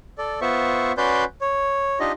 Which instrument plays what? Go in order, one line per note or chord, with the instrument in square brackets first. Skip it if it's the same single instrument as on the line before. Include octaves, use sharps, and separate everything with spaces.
[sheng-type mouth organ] A4 D5
B3 F4 C5 E5 C#6
C#4 F#4 B4 D5 C6 G6
C#5
D4 D#4 F4 G4 D#5